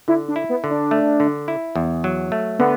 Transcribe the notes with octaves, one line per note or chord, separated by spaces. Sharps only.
D3 E4
D4
E4
B3
D3
D4
A3
D3
E4
E2
F#3
A3
D3 B3